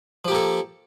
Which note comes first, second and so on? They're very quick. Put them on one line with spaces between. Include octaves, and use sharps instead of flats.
F3 G4 A#3 A4